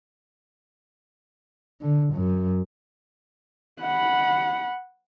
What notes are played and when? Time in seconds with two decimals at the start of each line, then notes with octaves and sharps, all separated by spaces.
1.81 D3
2.14 F#2
3.81 F#5 B5